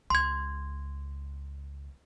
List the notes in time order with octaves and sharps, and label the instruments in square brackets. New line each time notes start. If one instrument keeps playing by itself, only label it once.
[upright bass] C#2 [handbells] C6 G#6